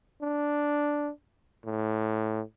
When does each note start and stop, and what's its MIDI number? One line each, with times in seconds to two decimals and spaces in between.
0.22 1.10 62
1.65 2.42 45